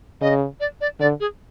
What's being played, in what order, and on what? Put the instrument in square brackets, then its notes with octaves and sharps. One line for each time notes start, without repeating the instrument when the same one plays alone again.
[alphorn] C#3 [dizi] D#5
[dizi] D5
D5
[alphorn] D3 [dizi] D5
[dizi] G#4